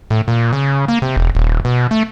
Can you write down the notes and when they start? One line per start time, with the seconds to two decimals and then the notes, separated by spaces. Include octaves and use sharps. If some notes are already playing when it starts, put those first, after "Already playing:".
0.10 A2
0.28 A#2
0.53 C#3
0.88 A#3
1.02 C3
1.17 E1
1.35 D#1
1.65 B2
1.91 A3